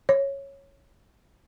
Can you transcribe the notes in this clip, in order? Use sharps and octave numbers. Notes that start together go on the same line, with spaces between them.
C#5